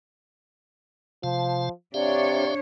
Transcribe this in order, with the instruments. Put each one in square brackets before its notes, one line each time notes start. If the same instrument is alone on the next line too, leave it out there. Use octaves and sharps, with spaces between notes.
[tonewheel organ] C3 F5 A5 [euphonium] F3
[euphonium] C3 [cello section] D4 C#5 [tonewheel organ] G4 E5 F5 [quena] D5